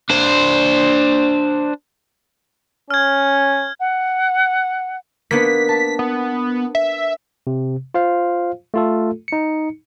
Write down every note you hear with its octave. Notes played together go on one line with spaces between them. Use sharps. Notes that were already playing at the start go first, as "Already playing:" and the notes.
D4 C5
C#4 F6 G#6
F#5
A#3 B3 D4 B6
A5
B3
E5
C3
F4 C5 F5
A3 F4 A4
D#4 C#7